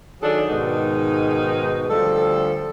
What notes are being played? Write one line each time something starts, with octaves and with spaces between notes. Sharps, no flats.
D#3 F#3 D4 G#4 A4
G#2 B2 D#3 G#3 D#4
D2 F3 G3 A4